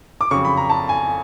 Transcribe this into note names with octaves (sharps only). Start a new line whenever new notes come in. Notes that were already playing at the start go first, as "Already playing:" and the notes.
D6
F2 C#3 F#3 C#6
B5
A#5
A5
G#5